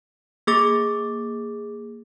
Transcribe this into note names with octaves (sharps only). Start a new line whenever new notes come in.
A#3 G#4 D6 A6